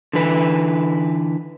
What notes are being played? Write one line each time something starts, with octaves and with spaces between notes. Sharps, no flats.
D3 E3 B4